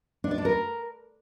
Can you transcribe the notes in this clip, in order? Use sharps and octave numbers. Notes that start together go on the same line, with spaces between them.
D4
D5
D4
A#4